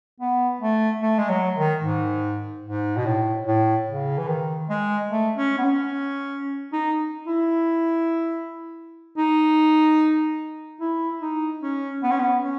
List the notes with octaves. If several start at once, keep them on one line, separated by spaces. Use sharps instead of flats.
B3
A3
A3
G#3
F#3
D#3
G#2
G#2
B2
A2
A2
C#3
E3
D#3
G#3
A3
C#4
B3
C#4
D#4
E4
D#4
E4
D#4
C#4
B3
C#4
B3
C#4